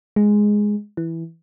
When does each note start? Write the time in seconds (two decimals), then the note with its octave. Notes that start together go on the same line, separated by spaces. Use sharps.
0.16 G#3
0.97 E3